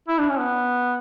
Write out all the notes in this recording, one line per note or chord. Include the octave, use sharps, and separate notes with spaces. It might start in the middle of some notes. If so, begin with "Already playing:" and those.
E4
D4
C#4
B3